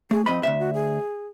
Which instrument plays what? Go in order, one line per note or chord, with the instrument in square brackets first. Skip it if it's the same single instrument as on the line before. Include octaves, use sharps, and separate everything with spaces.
[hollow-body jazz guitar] A3 [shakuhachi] G#4
[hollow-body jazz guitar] F2 D#5 B5 [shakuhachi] C4
[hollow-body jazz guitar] D2 G2 E5
[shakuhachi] F#4
G#4